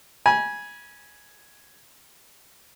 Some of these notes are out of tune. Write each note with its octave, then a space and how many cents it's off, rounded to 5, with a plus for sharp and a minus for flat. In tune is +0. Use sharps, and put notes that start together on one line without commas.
G#5 +0 B5 -35